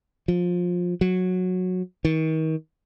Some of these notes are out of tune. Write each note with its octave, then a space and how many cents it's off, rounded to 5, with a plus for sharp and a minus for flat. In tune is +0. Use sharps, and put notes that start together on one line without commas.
F3 +20
F#3 -15
D#3 +35